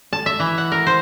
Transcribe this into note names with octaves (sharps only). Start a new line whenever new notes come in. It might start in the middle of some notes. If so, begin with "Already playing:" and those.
A5
E5
E3
F#5
A#4
C5